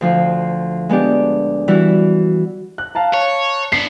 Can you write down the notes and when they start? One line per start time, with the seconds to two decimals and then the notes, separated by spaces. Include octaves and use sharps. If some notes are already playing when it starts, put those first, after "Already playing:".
0.01 D2 F3 F4
0.89 G#3 B3 D4 G4
1.68 E3 G3 E4 F#4
2.78 F#6
2.95 F5 A5 A#5
3.14 C#5
3.72 B3 D4 C7